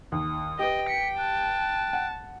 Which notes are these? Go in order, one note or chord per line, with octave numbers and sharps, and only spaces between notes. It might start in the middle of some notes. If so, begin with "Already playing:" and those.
D#2 D#6
G4 B4 D#5 G5
B6 C#7
A5 F#6
F#5